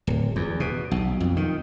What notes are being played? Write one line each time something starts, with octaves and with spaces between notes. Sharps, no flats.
D1
E2
B2
B1
F2
D#3